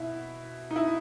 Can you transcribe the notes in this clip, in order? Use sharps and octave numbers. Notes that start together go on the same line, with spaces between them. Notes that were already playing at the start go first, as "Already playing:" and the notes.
Already playing: B2 E4
D#4
E4